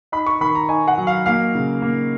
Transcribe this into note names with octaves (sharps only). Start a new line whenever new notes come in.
D#4 B5
C#6
D#3 B5
A#5
D#4 G#5
F#5
F#3
F5
A#3 F5
C#3
A#3